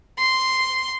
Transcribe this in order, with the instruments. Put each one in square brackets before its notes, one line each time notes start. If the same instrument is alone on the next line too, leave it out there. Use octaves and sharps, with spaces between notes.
[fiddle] C6